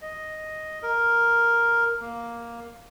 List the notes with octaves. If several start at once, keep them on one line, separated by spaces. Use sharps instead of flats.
D#5
A#4
A#3